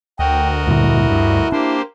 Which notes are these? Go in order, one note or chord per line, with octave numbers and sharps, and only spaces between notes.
D2 F#4 A#4 D#5 G5
G2 A#2 D3 E4
G2
A#3 D4 G4 C5